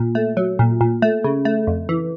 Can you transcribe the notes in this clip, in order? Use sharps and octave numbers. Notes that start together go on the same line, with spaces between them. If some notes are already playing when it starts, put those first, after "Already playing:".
Already playing: A#2
A3
F#3
A#2
A#2
A3
C#3
A3
F2
E3